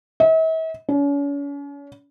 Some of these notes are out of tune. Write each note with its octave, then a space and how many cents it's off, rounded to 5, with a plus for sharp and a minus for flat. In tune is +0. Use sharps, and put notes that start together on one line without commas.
E5 -45
C#4 +40